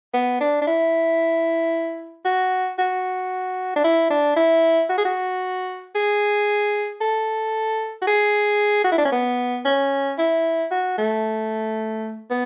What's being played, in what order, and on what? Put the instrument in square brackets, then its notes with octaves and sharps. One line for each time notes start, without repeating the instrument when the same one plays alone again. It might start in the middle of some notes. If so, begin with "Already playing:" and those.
[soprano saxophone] B3
D4
D4
E4
F#4
F#4
D4
E4
D4
E4
F#4
G#4
F#4
G#4
A4
F#4
G#4
F#4
E4
D4
C#4
B3
C#4
E4
F#4
A3
B3